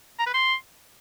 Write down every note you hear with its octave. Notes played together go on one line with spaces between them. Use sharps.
A#5
B4
C6